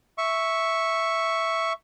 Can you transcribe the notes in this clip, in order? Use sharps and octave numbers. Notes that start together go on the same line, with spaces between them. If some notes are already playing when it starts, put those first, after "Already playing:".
E5 C#6